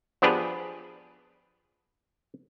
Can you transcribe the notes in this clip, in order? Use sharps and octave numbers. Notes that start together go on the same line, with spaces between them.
F3 B3 D4 G4 G#4 B4